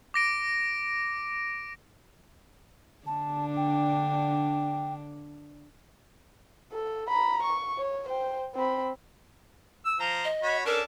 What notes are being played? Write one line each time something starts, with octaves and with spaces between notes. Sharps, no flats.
D6 A#6 D7
D3 D4 A5
G5
A4
A#5 B5
C#6
C#5
C5 G5
C4 B5
E6
F3 C5 A#5
D#5
F#4 C#5 B5
C#4 D4 A4 A#4